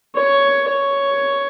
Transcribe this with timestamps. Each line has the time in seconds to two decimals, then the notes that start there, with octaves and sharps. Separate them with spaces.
0.16 C#5
0.68 C#5